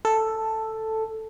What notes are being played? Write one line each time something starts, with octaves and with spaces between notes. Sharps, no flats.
A4